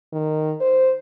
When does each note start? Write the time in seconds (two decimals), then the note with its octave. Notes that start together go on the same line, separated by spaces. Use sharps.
0.13 D#3
0.61 C5